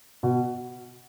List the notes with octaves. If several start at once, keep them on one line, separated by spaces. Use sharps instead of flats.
B2